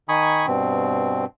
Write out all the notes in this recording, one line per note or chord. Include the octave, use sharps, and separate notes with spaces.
D#3 G#5 B5 C#6 D#6
G2 B2 C4